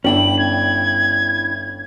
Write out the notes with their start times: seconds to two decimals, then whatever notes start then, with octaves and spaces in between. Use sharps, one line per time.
0.04 G1 C#4 D4 E4 G5 F#7
0.39 G#6